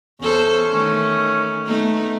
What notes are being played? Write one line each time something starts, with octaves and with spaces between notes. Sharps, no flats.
E2 C#4 A4 C5
D#3 A3 C#4
A3 B3 D#4